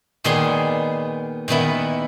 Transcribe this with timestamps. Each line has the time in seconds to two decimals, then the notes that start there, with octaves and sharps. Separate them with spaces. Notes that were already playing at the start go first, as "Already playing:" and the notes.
0.24 A#2 D#3 B3 G#4 D5 C6
1.48 A#2 D#3 B3 E4